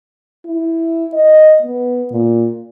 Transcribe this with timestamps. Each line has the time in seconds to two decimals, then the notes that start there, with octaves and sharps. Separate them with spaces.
0.46 E4
1.13 D#5
1.62 B3
2.12 A#2